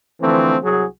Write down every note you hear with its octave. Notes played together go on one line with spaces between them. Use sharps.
D3 E3 F3 A3 C4
C2 F#3 F#4 G#4